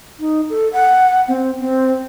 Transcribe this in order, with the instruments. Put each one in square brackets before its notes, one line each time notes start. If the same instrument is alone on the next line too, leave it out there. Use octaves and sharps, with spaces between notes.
[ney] D#4
A4
F#5
C4
C4